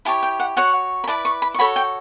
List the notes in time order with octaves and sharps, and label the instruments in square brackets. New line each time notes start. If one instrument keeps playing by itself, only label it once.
[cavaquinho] E4 G4 C#5 A5
G5
F#5
F#4 C#5 F#5
B5
E4 B4 D5 A5
C#6
B5
C#6
F#4 A4 C#5 B5
G5